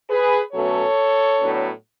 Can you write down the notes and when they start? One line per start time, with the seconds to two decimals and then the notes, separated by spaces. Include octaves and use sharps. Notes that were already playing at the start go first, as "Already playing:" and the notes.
0.10 G#4 B4
0.53 B2 F#3 A3 C#4 A4 C#5
1.40 A2 F#3 B3 D4